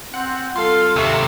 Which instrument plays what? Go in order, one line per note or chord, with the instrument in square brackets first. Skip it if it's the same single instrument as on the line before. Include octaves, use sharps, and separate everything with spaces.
[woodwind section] C4 [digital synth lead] F#5
[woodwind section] G3 C4 F4 [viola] A4 F5 [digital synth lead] C6
[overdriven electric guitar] D#2 C3 [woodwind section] E5 A#5 C#6 [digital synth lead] E6